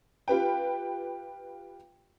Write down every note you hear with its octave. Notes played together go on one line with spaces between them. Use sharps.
F4 G4 B4 G5